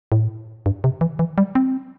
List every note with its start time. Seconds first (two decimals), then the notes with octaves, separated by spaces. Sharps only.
0.12 A2
0.66 G2
0.84 C3
1.01 E3
1.19 E3
1.38 G3
1.55 C4